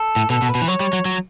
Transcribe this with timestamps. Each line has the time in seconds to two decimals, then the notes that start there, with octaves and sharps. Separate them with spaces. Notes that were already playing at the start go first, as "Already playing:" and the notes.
Already playing: A4
0.16 A2
0.30 B2 A4
0.42 B2
0.49 B4
0.55 B2
0.62 E3
0.68 F#3 C#5
0.80 G3
0.93 F#3
1.05 F#3